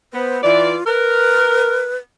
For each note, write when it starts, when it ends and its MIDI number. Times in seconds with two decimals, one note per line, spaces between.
0.14 0.38 59
0.14 0.43 72
0.43 0.76 52
0.43 0.84 65
0.43 0.76 74
0.87 1.86 70
0.87 1.96 71